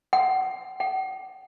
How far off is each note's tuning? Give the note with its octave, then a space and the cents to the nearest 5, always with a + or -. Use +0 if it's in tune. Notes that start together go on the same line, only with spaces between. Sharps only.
F#5 +30
F#5 +45